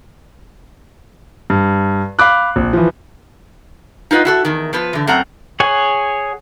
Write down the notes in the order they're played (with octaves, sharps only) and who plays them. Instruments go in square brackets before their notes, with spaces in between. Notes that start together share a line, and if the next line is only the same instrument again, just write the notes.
[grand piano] G2
F5 B5 D6 F#6
A#1
E3 F3
[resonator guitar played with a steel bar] D#4 F4 B4 D#5 F#5
E4 F#4 A4
E2 D#3
F3 B3 B4
D3 E3
F#2 A3 C4 F#5 A#5
[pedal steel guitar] G#4 C#5 F#5 G#5